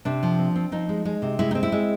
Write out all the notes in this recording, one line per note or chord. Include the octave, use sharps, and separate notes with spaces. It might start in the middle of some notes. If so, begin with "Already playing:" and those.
C3 D4
F3
C4
C4
F3 D#4
G#3
G#3
C3
G#3 E4
D#4
C4
E4
G#3